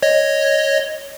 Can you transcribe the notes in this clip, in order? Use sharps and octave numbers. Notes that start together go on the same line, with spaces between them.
C#5 D#5